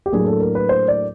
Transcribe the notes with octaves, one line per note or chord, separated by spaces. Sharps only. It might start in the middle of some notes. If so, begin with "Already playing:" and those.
G4
A2 F#3 A#3 D4 G#4
A4
A#4
B4
C5
D5